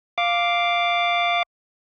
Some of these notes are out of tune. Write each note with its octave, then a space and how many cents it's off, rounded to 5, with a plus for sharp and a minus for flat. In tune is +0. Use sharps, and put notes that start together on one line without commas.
F5 +0 D6 +0